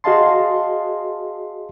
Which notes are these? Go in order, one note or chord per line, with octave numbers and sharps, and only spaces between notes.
F#4 G#4 D#5 F5 A5 C6